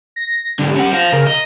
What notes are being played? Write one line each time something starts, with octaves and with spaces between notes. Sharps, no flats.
A#6
G#2 D3 G3
C#4 F#5
C5 F5 A#6
C#3 A#4
D#5 A#5